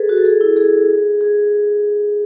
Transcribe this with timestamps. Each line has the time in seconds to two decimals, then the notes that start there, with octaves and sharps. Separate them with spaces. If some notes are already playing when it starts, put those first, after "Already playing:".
Already playing: G#4 A4 B4
0.09 F#4
0.18 A4
0.25 G#4
0.41 E4
0.56 G#4
1.21 G#4